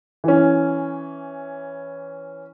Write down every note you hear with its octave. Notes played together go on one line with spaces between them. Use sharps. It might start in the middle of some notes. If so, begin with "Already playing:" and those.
E3 C#4